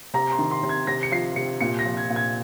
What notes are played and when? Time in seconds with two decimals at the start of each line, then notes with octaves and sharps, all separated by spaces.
0.14 C3 A#5
0.32 C6
0.39 D#3
0.51 C6
0.63 C3
0.69 G#6
0.87 C3 A#6
1.03 C#7
1.12 F3 C7
1.36 C3 C#7
1.61 A#2 C#7
1.79 A#6
1.85 F3
1.97 G#6
2.10 A#2
2.16 G#6